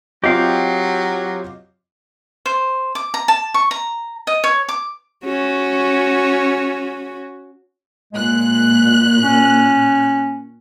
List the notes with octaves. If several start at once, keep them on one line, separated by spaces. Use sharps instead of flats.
F#3 C4 F4 G4 D#5 F5
C5
D6
A#5
A5
C#6
A#5
D#5
C#5
D6
C#4 F#4
A#2 G#3 F#6
C#4